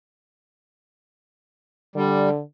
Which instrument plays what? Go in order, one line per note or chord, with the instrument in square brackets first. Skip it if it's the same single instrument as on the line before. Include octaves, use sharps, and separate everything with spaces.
[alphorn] D3 [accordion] G3